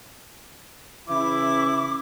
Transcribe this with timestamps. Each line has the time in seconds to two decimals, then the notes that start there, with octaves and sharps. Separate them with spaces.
1.08 C#3 E3 E4 D6